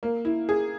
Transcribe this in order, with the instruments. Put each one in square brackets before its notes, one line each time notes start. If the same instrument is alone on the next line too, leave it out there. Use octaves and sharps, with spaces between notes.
[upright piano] A#3
E4
G#4